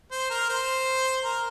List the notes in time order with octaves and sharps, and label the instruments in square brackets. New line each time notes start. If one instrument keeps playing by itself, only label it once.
[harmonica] C5
A#4
C5
A#4